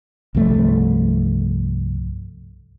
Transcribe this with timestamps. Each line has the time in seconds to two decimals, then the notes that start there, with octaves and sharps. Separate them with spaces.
0.35 C2 G2 F3 A3